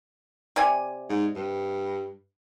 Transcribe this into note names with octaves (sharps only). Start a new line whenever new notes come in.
C3 D5 G#5
G#2
G2